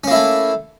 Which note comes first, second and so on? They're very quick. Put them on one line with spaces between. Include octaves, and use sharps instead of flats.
C#4 A#3 E4 A3